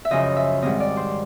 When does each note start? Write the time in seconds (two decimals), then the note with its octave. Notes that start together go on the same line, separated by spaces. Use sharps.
0.05 E5
0.11 F#2 C#3 F3 D#5
0.36 E5
0.62 G#2 D#3 G3 C4 D#5
0.80 D5
0.97 C5